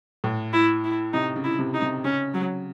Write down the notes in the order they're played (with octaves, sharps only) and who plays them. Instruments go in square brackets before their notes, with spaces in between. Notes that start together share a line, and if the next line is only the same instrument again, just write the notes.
[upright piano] A2
[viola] E4
E4
[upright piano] C3 [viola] D#4
[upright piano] C#3
[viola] E4
[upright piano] C3
[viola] D#4
[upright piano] C3
[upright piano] C#3 [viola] C#4
[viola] F#3